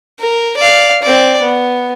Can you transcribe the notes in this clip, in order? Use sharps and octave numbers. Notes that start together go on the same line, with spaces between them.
A#4
D5 F5
C4 D5
B3